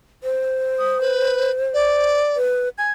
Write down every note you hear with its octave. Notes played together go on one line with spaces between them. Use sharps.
C5
D#6
B4
D5
B4
G#5 G#6